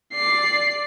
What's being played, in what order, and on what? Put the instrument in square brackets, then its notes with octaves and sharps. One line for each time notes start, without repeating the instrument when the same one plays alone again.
[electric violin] D5 C7